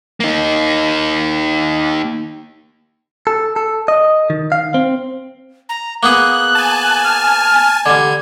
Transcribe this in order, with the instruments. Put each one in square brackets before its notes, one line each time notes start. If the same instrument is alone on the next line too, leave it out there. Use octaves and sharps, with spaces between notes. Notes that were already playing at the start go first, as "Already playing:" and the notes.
[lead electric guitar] A#3 D#4
[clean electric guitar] A4
A4
D#5
D#3
F5
C4
[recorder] A#5
[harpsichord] A#3 B3 G#4 [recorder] F#6
[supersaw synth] G#5 A5
[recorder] F6
[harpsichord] D3 G3 [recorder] G#6